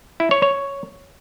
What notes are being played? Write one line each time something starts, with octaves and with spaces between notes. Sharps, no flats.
E4
C#5
C#5